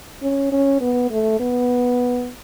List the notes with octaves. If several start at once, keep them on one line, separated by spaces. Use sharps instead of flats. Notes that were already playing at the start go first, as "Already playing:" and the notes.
C#4
C#4
B3
A3
B3